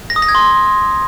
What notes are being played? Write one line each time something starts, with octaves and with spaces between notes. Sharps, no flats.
A#6
D#6
A#6
G#6
C6